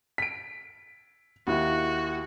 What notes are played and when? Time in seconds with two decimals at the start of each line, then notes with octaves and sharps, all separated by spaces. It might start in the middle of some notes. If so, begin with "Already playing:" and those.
0.18 B6 D7
1.47 D#2 E4 F#4